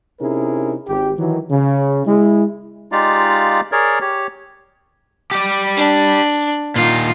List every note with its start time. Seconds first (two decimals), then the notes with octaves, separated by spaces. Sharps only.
0.20 C3 C#4 D#4 E4 G#4 A#4
0.87 G#1 G4
1.18 D#3 E3 F#3
1.50 C#3
2.06 G#3 E4
2.92 G#3 D#4 F4 G4 D5 F5
3.72 G#4 A#4 C#5 D5
4.01 G4 C#5
5.31 G4 D5
5.77 D4
6.76 A#2 D#3 F4